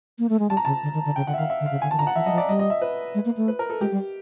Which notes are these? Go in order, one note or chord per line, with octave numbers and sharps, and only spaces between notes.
A#3
A3
G#3
G3 A5
A#5
C#3 A5
D3
D#3
D3
C#3 G5
D3 F#5
E5
D#3 F5
E5
D3
F5
C#3
D3 G#5
D#3 A5
D3 A#5
F#5
E3 E5
F#3 D#5
F3
D5
G3 D#5
D#5
E5
B4
G#3
A#3
A3
B4
A#4
A4
G#3 G4
G3